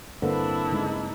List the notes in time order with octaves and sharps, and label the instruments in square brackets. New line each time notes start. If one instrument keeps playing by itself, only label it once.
[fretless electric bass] G2 A#3 C4 [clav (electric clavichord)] D3 [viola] D4 E4 [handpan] B4
[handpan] C#3 G#3 D#4